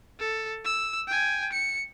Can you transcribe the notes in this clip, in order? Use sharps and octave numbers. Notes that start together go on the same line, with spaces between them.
A4
E6
G5 G#5
C#7